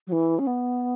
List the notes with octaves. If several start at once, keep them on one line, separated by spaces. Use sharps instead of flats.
F#3
E3
C#4
B3